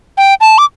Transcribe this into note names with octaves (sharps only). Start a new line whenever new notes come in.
G5
A5
D6